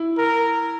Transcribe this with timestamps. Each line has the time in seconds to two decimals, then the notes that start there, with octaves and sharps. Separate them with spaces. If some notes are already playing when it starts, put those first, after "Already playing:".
Already playing: E4
0.18 A#4